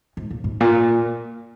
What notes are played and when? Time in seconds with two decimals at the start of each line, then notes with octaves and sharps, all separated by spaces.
0.17 G#2
0.30 A#2
0.44 G#2
0.60 A#2